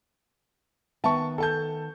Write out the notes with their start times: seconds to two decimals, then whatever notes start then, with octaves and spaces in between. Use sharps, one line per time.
1.04 D#3 B3 E5 A5 C#6
1.38 A4 A5 G6